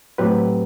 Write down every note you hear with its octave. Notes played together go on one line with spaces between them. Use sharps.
A2 F#3 C4 G4 B4